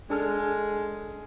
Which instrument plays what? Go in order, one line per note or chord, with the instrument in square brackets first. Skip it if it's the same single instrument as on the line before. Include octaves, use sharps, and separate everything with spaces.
[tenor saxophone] G#3 [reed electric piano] D4 A4 F6